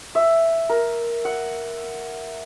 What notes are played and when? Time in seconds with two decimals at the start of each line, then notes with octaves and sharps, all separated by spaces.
0.15 E5
0.69 A#4
1.25 F#5